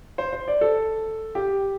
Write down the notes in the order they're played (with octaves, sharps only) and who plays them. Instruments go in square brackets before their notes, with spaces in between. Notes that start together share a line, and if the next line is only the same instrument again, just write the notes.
[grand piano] C5
C5
D5
A4
G4